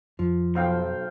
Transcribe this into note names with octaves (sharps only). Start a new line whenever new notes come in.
F2 F3
B1 C5 F5 G5